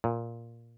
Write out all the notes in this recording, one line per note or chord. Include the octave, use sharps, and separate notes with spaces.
A#2